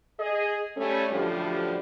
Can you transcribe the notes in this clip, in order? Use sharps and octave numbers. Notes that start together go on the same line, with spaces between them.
G#4 D#5
G3 A3 C#4
F#2 A2 D3 F3 G3